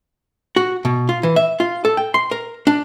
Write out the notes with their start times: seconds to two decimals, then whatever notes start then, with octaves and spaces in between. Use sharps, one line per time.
0.56 F#4
0.85 B2
1.09 F4
1.23 E3
1.36 E5
1.60 F4
1.85 A4
1.97 G5
2.14 C6
2.31 A#4
2.67 D4